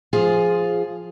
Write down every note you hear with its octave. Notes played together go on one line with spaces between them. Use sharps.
F3 F4 G#4